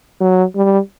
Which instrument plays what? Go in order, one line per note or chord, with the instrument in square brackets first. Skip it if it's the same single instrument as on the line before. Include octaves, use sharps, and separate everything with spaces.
[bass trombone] F#3
G3